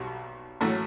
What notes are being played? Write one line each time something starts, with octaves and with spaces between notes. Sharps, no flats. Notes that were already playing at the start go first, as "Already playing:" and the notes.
Already playing: B1 B2 F#3 G3
A1 A2 F#3 A3